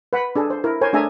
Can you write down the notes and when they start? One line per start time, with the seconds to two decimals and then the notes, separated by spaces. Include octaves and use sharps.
0.13 B4 F#5 B5
0.36 D4 G#4 A4
0.50 C5
0.64 E4 A#4
0.81 A#4 C5 C#5 G#5
0.93 A3 D4 G#4 E5 G#5 A#5